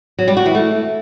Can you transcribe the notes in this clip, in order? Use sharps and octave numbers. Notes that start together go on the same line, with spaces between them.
F#3
G3
F#4
E3
A3